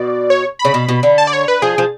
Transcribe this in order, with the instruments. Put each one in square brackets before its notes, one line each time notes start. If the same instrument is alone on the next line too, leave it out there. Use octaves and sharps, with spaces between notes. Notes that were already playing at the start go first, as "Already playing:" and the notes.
Already playing: [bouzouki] B2 [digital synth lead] D5
[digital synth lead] C#5
B5
[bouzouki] C#3
B2
B2
D3
[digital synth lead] A5
D5
C#5
B4
[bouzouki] F3 [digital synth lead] G#4
[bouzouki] F3